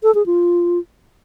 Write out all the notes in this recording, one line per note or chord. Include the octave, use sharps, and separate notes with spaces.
A4
G#4
F4